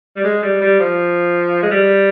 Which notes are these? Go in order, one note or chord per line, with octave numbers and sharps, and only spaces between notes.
G3
G#3
G3
G3
F3
G#3
G3